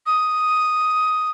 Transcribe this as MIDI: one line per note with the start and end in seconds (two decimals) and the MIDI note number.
0.06 1.30 87